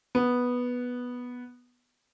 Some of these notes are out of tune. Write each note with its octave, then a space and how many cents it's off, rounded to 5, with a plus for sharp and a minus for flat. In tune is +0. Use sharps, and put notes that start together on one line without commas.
B3 -5